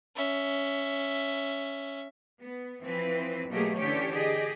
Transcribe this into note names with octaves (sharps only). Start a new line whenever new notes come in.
C#4 E5
B3
E3 F3 C4 B4
B2 F#3 A3 A#3 G4 G#4
D3 E3 C#4 G4 C#5
G4 G#4 D#5